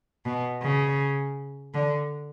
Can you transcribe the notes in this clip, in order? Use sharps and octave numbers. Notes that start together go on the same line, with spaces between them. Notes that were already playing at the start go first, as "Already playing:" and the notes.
B2
C#3
D3